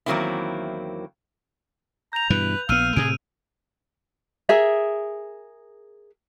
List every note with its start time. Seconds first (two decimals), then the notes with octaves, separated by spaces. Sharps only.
0.06 E2 D#3 F#3 A#3 C4 E4
2.13 A#5 G6 F7
2.30 G2 B2 E3 B4
2.69 A#1 B3 F5 E6 F6 D#7
2.96 A2 C3 G#4 D7
4.49 G#4 A#4 E5